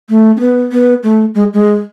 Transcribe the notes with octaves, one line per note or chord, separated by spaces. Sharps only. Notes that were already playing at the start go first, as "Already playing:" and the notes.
A3
C#4
B3
B3
A3
G#3
G#3